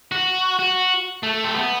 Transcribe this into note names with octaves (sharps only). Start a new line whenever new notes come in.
F#4
F#4
A3
C4
B3